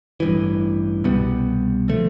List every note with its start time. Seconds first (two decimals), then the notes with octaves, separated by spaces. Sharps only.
0.20 A1 G2 E3
1.04 C2 B2 G3 B3
1.88 D3 F3 A3